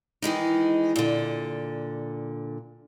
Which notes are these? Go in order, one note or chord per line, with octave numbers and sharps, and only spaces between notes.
D#3 E3 G#3 D#4
A#2 D3